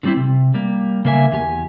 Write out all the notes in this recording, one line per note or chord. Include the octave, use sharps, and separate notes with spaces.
D3 F#3 G3 C4 E4
C3
G3 A#3
C#3 A#3 A#4 E5 G#5
E2 G4 G#5